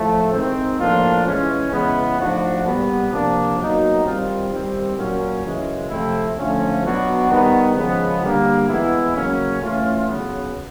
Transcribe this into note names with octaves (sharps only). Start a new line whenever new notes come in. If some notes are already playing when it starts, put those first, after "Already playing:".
Already playing: A2 F3 A3
D#3 G#3 C4
A2 F3 A#3 D4 F4
E3 G#3 C#4
C#3 E3 G#3 B3
G#2 F3 A3 D4 F#4
A#2 G3 B3
C3 F3 A#3 D4
B2 F#3 A#3 D#4 F#4
D#3 G3 C4 F4
D#3 G3 C4
A#2 F#3 A#3 C#4
F#2 C#3 E3 G#3
C3 F3 A3 C4 E4
D3 F3 A3 C#4 F4
B2 F#3 B3 D4 F#4
D#3 G3 B3
C#3 F3 G#3 B3
D3 G3 A#3
E3 G#3 B3 E4
C#3 F#3 A#3 C#4
E3 A3 C#4 F4
C#3 F#3 B3